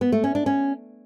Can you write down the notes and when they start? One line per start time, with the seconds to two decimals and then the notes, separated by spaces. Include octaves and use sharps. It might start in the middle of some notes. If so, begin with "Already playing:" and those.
0.01 B3
0.12 A3
0.24 C#4
0.35 D4
0.46 C#4